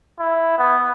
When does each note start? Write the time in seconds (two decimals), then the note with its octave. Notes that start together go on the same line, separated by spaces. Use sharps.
0.19 E4
0.58 B3